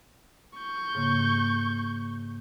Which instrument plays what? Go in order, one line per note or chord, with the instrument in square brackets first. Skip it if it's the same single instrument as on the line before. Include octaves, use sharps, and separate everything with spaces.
[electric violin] C#6 G6
[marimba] G#2 C#3 A#3